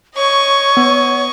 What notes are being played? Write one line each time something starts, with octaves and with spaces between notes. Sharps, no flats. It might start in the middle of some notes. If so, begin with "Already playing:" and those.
C#5 D#5 C#6
B3